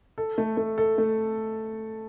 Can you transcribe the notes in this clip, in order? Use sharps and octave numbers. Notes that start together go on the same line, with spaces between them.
A4
A3
A3
A4
A3